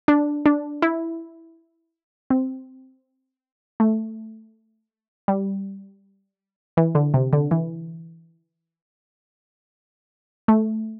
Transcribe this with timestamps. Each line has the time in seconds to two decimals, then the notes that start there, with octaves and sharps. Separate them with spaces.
0.08 D4
0.46 D4
0.82 E4
2.30 C4
3.80 A3
5.28 G3
6.77 E3
6.95 D3
7.14 C3
7.33 D3
7.51 E3
10.48 A3